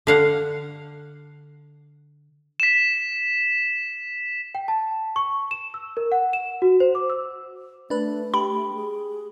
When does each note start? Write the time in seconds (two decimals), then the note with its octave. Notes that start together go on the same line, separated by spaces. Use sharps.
0.07 D3 F5 F#5
2.60 B6 E7
4.55 G5
4.68 A5
5.16 C#6
5.51 E7
5.74 E6
5.97 A#4
6.12 F#5
6.33 E7
6.62 F#4
6.80 C5
6.95 D6
7.10 E6
7.90 A3 D4 B4
8.34 G4 B5
8.74 G#4